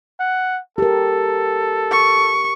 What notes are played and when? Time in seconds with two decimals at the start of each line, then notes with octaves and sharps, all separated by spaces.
0.20 F#5
0.78 G4 A4 A#4
1.92 C#6